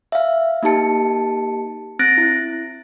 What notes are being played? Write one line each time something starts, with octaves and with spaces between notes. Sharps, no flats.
E5 F5
A#3 D#4 G4 A5 C#7
C4 F#6 A6 A#6 D7
E4